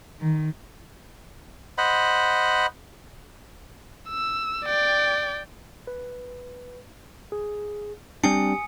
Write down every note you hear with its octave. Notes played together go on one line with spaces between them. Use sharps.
D#3
C5 D#5 F#5 B5
E6
D5 G5
B4
G#4
G3 C4 D4 G4 G#5 D#6 C#7